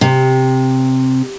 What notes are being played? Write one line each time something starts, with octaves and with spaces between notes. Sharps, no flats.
C3